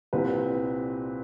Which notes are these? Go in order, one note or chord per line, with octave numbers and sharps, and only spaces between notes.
C2 A#2 G3 C4 B4